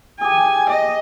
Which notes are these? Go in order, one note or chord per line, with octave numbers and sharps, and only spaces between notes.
G4 G#4 G#5
D#5